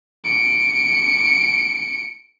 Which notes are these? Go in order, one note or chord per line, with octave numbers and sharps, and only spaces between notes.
C#7 D7